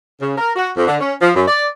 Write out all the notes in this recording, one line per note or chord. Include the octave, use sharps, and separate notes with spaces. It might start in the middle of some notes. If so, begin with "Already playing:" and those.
C#3
A#4
F#4
F2
D3
C#4
F3
F#2
D5